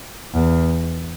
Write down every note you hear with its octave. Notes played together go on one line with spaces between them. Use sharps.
E2